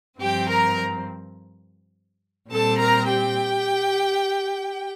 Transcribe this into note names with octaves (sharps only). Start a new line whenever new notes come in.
G2 F3 C4 G4 G5
A#4 A#5
A#2 G3 C4 A4 A5
A#4 A#5
G4 G5